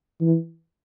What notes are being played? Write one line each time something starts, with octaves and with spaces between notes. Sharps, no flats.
E3